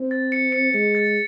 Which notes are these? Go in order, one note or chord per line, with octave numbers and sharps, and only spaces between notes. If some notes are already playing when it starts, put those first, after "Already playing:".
Already playing: C4
A6
C#7
C#7
G#3 C#7
A6